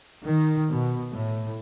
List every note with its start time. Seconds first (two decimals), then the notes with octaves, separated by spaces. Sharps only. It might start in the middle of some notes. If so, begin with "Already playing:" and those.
0.24 D#3
0.70 B2
1.12 A2